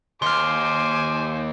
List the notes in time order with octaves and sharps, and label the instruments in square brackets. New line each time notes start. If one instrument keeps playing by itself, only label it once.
[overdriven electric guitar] D#2 [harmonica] C5 G#5 [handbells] C6 F6 [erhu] D6